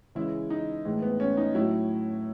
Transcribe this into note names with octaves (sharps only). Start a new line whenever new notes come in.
C#3 E3 G#3 E4
D#4
A2 E3 G#3
B3
C#4
D#4
A2 F#3 E4